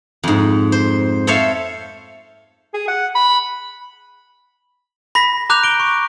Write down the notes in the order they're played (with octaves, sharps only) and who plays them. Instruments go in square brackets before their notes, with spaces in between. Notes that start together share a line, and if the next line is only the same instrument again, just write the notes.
[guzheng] F2 G#2
C5
A4 C5 C#5 E5 F5
[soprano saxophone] G#4
F#5
B5
[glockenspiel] B5 A#6 B6
A#5 D6 F#6 G6 F7
D7 G7
C#6